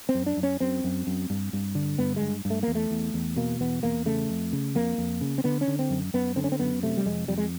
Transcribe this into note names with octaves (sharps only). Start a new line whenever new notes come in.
C4
F#2
D4
F#2
C#4
F#2 C4
F#2
F#2
G2
G2
D3
G2 B3
G#3
G2
G2
A3
E2 A#3
A3
E2
E2
B2 A#3
E2 B3
E2 A#3
C#3 A3
F2
C#3
F2 A#3
F2
C#3
C4
D3 B3
C#4
D3
C4
F#2
F#2 B3
D3 C4
C#4
C4
F#2 B3
C3 A3
G3
F2 G#3
F2 G3
G#3